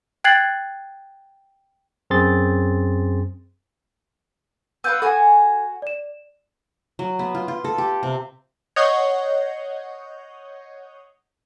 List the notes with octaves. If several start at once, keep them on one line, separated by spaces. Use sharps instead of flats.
G5 F#6 G#6 A6 C7 F#7
F#2 C4 G#4 C6 A6
B3 F4 B4 E6 G6
F#4 A4 F#5 G#5
D5 E7
F#3
B3
F4
F4
A4
G4
C3
C#5 D#5 F#5 G6 G#6 C7